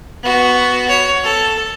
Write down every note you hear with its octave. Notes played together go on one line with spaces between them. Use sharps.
B3 F#4
C#5
A4